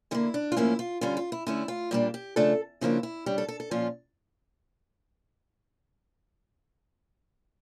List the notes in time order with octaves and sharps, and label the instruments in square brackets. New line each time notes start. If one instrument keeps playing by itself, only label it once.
[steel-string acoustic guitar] D3 G3 A#3 E4
D4
F4
A2 F3 A#3 C#4 E4
F4
D3 G3 C#4 F4
F4
E4
D3 A3 C#4 E4
F4
A#2 G3 A#3 D4 G4
G4
C#3 F3 A3 D4 A4
C#3 F3 A#3 D4 E4
E4
C#3 G3 D4 G4
A4
A4
A4
A#2 F3 C#4 F4